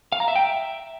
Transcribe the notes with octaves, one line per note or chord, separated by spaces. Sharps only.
F5
A#5
E5
G5
E5